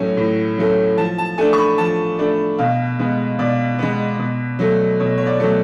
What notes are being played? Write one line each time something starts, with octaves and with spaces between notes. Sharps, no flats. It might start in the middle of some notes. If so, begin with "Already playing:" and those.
Already playing: A2 F#3 A3 C#4
A2
F#3 A3 C#4
F3 A5
A5
A3 D4 G#5
C#6
B5
F3 A5
A3 D4
B2 F5
G#3 B3
B2 D5
G#3 B3
B2
F#3 A3
B2 C#5
C#5
D5
F#3 A3